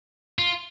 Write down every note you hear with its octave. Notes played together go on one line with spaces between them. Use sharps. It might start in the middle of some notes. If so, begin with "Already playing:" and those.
F4